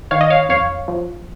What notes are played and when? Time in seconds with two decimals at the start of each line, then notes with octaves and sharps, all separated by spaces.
0.11 D#3 C#5 F5
0.21 D#5
0.30 C#5 F5
0.49 F2 C#5 F5
0.88 F3